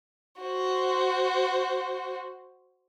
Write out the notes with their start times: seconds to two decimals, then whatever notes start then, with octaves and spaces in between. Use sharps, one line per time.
0.42 F#4 C5